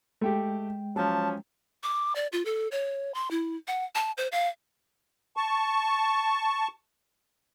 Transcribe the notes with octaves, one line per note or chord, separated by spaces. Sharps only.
G#3 A3 G4 G5
F3 F#3 C#4 A5
D6
D5
F4
A4
C#5
C6
E4
F#5
A5
C5
F5
A5 C#6